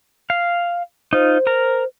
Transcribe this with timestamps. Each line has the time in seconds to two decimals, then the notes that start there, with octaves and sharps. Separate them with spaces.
0.30 F5
1.13 D#4 F4 C5
1.47 A#4 A#5